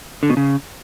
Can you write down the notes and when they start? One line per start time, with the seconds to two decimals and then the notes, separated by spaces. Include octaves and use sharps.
0.23 D3
0.30 B2
0.37 C#3